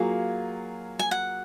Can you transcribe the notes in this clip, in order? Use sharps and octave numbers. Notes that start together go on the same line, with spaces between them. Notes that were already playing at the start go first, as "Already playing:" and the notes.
Already playing: F#3 A#3 F4 G#4 F5
G#5
F#5